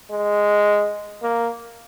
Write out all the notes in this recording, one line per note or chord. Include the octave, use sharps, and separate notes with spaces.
G#3
A#3